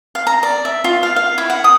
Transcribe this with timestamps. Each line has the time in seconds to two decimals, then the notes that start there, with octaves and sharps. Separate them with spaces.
0.15 F5
0.27 A#5
0.43 D5
0.65 E5
0.84 F4
1.03 F5
1.16 F5
1.38 E4
1.50 F#5
1.64 D#6